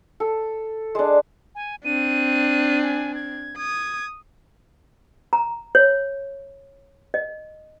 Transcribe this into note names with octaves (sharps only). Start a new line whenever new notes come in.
A4
G#3 D4
G#5
C4 D4 D#7
G#5
G#6
D#6 G#6
A#5
C#5
D#5